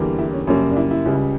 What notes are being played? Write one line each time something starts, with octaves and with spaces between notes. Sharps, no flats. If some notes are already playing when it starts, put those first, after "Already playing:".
Already playing: E2 D3 G3 A#3
E4
C#4
F#2 C#3 G3 A#3 C#4
D4
E4
E4
C#2 C#3 G3